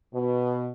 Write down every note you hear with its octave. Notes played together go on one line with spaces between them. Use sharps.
B2